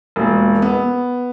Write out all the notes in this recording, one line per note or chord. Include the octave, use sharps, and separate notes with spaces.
E1 A#2
B3